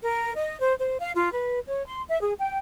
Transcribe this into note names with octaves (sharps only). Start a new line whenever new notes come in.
A#4
D#5
C5
C5
F5
F4
B4
C#5
C6
E5
G#4
G5